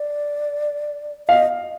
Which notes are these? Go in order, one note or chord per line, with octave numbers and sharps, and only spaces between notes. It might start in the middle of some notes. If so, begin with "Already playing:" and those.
Already playing: D5
D#5 F5